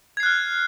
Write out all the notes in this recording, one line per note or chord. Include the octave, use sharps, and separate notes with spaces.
F6 F#6 G#6 C7